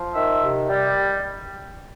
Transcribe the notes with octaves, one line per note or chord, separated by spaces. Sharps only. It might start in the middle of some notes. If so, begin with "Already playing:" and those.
Already playing: F3
D#3 E5
C3
G3